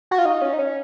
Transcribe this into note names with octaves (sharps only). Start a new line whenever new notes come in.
F#4
F4
D#4
C#4
D#4
C#4